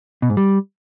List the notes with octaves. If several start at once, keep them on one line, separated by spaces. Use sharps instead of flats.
B2
G#2
G3